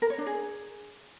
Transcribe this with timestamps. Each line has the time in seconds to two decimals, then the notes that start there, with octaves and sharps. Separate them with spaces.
0.02 A#4
0.10 C#5
0.18 D4
0.26 G#4